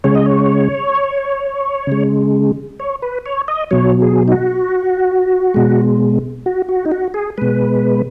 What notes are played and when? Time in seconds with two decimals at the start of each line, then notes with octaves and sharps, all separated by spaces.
0.04 C#3 G#3 C#5
0.15 D#5
0.26 C#5
1.87 C#3 G#3
2.79 C#5
3.02 B4
3.26 C#5
3.48 D#5
3.71 B2 F#3 C#5
4.02 G#4
4.28 D#4
4.32 F#4
5.54 B2 G#3
6.46 F#4
6.69 F#4
6.86 D#4
6.92 F#4
7.14 G#4
7.38 B2 G#3 B4